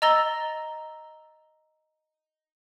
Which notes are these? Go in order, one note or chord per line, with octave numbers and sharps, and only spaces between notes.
D#5 A#5 E6 A6 A#6 G7